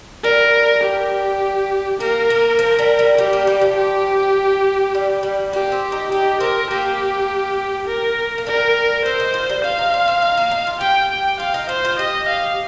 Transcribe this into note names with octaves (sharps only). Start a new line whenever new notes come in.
G3 A#4
G4
A#3 A#4
A#3
F3
G3
G3
G3 G4
A#3
G3
F3
G4
G3
G3
A#3 G4
C4
D#4
D#4 G4
C4 A#4
A#3 G4
A#4
A#3
G3 A#4
C4 C5
D#4
F4
G3
F4 F5
D#4
C4
C4
D#4
A#3
D#4
F4
G4 G5
G5
F4 F5
D#4
F4 C5
F4
G4 D#5
F5